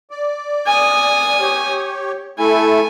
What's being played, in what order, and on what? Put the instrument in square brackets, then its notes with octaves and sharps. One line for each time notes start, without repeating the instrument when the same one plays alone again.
[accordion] D5
[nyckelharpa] G#5 D#6
[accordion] G4 C#5
[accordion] A3 E4 A4 [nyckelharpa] G#5